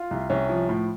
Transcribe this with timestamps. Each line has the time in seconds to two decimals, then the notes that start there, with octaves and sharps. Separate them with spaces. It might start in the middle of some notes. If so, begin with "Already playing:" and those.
Already playing: F4
0.11 C2
0.30 C2 C#4
0.49 F3
0.69 A2